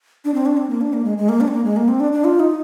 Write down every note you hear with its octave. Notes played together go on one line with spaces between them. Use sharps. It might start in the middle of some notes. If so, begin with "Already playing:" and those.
D4
C4
D4
C4
A#3
D4
A#3
G#3
G#3
A#3
D4
C4
A#3
G#3
A#3
C4
D4
D4
F4
D#4